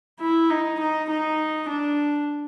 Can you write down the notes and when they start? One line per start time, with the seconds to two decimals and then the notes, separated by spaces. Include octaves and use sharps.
0.20 E4
0.50 D#4
0.80 D#4
1.09 D#4
1.69 D4